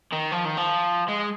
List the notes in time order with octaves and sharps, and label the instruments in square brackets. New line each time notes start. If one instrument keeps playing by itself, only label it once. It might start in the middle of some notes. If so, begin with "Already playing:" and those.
[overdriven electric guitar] D#3
F3
D#3
F3
G#3